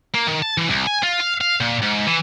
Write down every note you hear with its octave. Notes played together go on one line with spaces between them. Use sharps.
A#3
D#3
A5
E3
C2
G#5
F4
F5
F5
A#2
G#2
E3